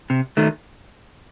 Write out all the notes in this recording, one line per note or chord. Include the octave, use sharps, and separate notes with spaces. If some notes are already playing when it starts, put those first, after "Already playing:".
C3
D#3 A3